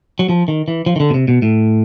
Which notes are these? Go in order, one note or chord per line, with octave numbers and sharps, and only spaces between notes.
F#3
F3
D#3
E3
F3
D#3
D3
B2
C3
B2
A2